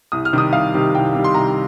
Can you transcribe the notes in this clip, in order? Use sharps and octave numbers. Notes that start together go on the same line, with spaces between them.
C2 D#6
F6
C3 D#3 G3 D#6
C2 F5
C3 D#3 G3
C2 G5
C3 D#3 G3
C6
C2 A#5